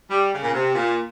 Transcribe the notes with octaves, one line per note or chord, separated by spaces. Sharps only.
G3
C#3
A#2
C3
A#2